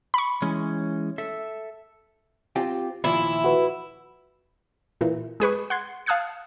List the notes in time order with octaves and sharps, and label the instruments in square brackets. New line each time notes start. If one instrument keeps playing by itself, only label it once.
[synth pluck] B5 C#6
[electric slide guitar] E3 G#3 C#4
A4 E5
[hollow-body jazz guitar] C4 F4 G4
[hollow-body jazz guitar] D#2 A#2 F3 [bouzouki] E4
[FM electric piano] F#4 B4
[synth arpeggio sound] A#2 E3
G#3 G#4 B4 C#6
F#5 C6 G#6
F5 A5 D#6 F#6 G#6 C#7